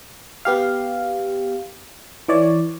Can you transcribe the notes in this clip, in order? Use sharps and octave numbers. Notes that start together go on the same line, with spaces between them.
B3 G4 F5
E3 C#5 D5